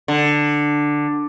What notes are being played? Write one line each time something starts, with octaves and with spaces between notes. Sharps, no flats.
D3